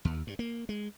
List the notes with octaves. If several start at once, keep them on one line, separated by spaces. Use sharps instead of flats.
D#2
G2
A#3
G#3